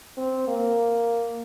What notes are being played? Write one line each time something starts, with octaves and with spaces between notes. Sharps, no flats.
C4
A#3